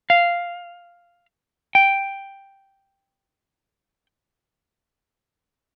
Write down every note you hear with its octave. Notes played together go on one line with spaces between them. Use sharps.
F5
G5